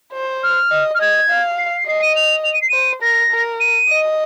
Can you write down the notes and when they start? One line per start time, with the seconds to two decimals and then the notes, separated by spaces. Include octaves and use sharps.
0.13 C5
0.43 F6
0.71 D#5
0.94 F6
0.99 D#5 G#6
1.29 F5
1.58 C7
1.86 D#5 C7
2.02 D#7
2.15 F7
2.44 F7
2.53 D#7
2.61 C7
2.69 C5 D#7
3.01 A#4 A#6
3.31 A#4
3.60 D#7
3.89 D#5